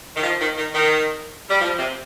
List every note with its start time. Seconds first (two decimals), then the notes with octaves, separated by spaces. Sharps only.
0.16 D#3
0.23 F3
0.40 D#3
0.57 D#3
0.74 D#3
1.49 G3
1.61 F3
1.78 C3